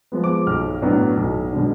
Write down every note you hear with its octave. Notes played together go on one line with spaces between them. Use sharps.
F3 G#3 B3
D6
B1 F6
A2 F#3 B3 D4
B1
B2 G#3 D4